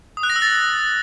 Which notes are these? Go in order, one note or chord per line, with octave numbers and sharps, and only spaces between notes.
D#6
F#6
A#6
E6
A6